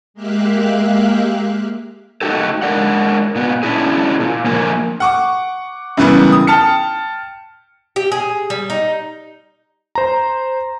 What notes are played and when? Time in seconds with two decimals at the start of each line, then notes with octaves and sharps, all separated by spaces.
0.14 G#3 A#3 G4 E5 F5 F#6
2.21 A3 D#4 F#4 G4 A4
2.62 G#3 D4 A#4 D5 F#5
3.35 A#2 B3
3.63 C#4 D4 E4 G#4
4.20 A#2
4.45 D3 F3 A#3 A#4 G#5
5.00 F#5 C#6 D6
5.97 F#2 C#3 E3 G3 B3
6.32 D#6
6.47 G5 A5 F6 C#7
7.96 G4
8.12 G#4
8.50 G3
8.70 D#4
9.95 C5 A#5